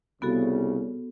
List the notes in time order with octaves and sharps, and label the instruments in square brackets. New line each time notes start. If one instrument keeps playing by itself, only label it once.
[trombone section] C2 C#3 [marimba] B3 F#4 A4